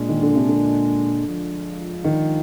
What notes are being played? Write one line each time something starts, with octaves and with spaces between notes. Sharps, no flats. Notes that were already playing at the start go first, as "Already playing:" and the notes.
Already playing: A#2 G#3 D4
D#3
D3
C3
D3
F3 G#3 D4 F4
D#3